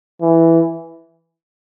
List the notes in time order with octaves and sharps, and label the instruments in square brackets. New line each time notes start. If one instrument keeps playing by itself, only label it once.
[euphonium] E3